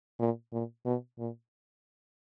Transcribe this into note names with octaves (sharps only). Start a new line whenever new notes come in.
A#2
A#2
B2
A#2